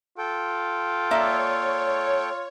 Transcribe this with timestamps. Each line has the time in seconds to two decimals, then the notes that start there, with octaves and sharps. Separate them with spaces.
0.18 F4 A4 G5
1.11 A#3 C#5 D5 E5